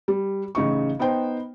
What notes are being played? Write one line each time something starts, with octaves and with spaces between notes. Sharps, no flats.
G3
A1 C#3 D#4 C#6
B3 D#4 C5 G5